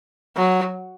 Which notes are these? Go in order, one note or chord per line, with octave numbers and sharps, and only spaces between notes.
F#3